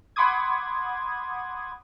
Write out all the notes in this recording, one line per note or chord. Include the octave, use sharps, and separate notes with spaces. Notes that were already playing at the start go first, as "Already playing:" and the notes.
F#5 B5 C6 D6 D#6 G#6